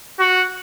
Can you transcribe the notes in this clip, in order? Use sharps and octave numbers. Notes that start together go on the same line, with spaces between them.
F#4